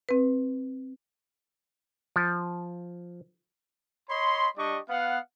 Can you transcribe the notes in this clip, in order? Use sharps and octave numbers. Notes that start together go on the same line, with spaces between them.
C4 B4
F3
C#5 D#5 B5 C6
G3 D4 G4 D5 D#5 C#6
B3 F5 F#5